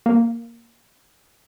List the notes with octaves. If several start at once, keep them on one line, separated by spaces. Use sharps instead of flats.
A#3